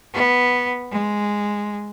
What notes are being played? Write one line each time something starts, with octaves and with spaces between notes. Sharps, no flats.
B3
G#3